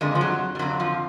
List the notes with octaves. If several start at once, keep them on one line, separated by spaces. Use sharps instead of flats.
F2 D3 G#3
F3
F#3
G3
F2 D3 F#3
F3